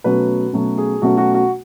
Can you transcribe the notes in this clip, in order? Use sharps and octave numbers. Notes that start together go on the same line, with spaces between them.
B2 F#3 A3 C#4 B4
B2 F#3 A3 C#4
G#4
B2 F#3 A3 C#4 F#4
F#4
F#4